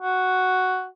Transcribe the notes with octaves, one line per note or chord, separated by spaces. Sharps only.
F#4